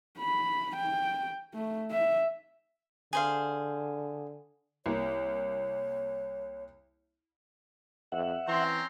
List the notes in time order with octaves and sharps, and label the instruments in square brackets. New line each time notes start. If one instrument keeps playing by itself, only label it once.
[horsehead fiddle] B5
G5
A3
E5
[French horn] D3 [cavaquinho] G#4 C5 F5
[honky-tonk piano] C2 A#3 [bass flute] C#5
[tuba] F2 [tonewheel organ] E5 F#5
[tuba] E3 [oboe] C4 [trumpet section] C#4 A#5 C6